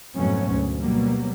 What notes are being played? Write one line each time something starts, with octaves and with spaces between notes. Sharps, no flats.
F2 G#2 B2 F#3 A3 C#4
D2
B2 F#3 G3 A#3